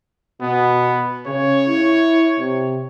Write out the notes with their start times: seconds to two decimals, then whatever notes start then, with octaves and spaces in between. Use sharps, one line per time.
0.41 B2 B3
1.27 C#3 C#5
1.68 E4
2.39 C3